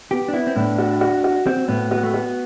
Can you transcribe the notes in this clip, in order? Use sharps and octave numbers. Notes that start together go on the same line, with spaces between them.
B3 G4
D4
B3 E4
C4
A2 D4
F#4
F#4
F#4
C4 F#4
A2 B3
B3 F#4
A3
B3 F#4